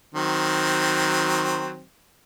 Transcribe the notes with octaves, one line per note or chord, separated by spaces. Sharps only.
D#3 F#3 C4